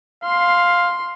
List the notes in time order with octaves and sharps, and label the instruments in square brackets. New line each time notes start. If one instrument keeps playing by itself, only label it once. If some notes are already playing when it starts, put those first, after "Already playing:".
[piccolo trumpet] F5 [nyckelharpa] C6